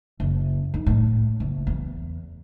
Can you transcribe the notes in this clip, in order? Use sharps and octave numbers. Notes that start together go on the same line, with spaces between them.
F#1
D#3
A2
F#1
E2